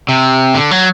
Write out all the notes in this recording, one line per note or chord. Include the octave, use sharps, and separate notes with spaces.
C3
D3
F#3